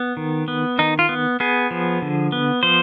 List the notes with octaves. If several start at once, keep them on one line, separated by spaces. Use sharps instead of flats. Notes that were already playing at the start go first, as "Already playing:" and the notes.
Already playing: B3
D#3
B3
D#3 D#4
F4
B3
B3 G#4
F3
D3
B3
F3 C5